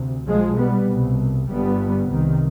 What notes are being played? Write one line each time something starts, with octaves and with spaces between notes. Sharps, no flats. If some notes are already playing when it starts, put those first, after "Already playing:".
Already playing: D2 C3
B1 B2 F3 G#3
G3 B3
C2 B2
G1 G2 G3 B3
C2 C3 D#3